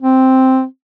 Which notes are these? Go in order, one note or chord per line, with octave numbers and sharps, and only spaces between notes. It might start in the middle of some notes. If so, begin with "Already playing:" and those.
C4